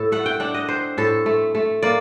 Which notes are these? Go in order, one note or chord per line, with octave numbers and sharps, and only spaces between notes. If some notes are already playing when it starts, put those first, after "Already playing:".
Already playing: A2 A4
A3 F#5
G5
D4 F#5
D#5
C4 C5
A2 A4
A3
A3
A#3 D5